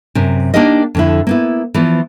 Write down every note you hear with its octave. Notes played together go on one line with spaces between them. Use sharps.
F#2 C3
A#3 D4 D#4 G4 A#4 D#5
F2 D3 E4
A#3 B3 E4
E3 F3 B3